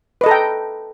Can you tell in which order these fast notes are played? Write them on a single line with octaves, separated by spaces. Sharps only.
B4 D#5 A4 A#5 G5